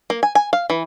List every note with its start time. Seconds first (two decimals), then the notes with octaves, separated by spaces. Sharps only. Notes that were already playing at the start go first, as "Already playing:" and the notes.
0.10 A#3
0.23 G#5
0.35 G#5
0.53 F5
0.70 E3